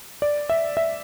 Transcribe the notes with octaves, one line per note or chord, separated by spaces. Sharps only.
D5
E5
E5